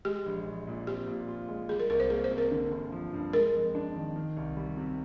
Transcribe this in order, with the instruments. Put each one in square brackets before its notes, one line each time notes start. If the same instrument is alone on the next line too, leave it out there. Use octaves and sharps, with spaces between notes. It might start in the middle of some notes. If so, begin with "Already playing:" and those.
[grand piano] G#3 [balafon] G4
[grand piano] A#1
A#1
A#2
[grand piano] C4 [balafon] G4
[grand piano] A#2
F4
G#3
[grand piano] G3 [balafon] G#4
[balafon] A#4
[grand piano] C2 [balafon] A#4
[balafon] C5
[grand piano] A#3 [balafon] G#4
[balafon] C5
[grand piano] C3
[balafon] A#4
[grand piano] D3
G1
F3
G2
[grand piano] G#3 [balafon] A#4
[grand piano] F2
D4
D#3
D#3
C2
G3
C3